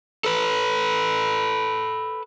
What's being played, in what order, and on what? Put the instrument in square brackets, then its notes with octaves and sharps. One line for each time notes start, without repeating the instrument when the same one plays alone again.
[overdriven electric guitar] A4 B4